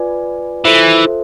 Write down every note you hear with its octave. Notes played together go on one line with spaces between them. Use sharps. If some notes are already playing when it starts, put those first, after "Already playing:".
Already playing: F4 B4 D5 G#5
E3 F4 A4 C5 E5